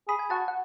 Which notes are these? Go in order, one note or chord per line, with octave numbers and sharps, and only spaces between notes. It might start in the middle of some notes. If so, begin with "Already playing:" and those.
G#4 B5 D#6
G#5
F#4 F#5 A5
F#5